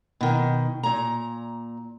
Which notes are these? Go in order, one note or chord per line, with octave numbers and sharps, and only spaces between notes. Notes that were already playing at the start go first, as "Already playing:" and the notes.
B2 D#3
A#2 A#5